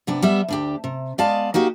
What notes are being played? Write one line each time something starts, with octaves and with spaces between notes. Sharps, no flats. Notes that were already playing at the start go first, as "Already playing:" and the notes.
C3 B3 D4
G3 B3 E5
D2 D4 G4
C3
G#3 B3 D5 D#5 F5 A5
A#3 D#4 F#4 G4